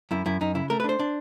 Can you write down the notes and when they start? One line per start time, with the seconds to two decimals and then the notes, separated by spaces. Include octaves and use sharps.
0.11 F#2 E4
0.26 F#2 E4
0.41 F#2 D#4
0.55 C#3 E4
0.70 A3 A#4
0.80 B4
0.84 D4 C5
0.99 D4